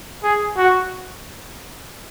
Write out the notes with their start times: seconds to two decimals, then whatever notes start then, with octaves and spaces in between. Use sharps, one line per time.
0.24 G#4
0.58 F#4